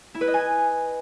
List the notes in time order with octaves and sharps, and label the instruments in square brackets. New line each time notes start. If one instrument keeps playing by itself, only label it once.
[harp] E4
B4
D#5
G#5